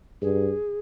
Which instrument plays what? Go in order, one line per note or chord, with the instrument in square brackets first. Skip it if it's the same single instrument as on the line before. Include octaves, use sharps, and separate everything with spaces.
[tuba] G2 [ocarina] G#4